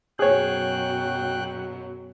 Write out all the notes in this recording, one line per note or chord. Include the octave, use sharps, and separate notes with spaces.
F#2 B2 F#3 G#4 C#5 G5 F#6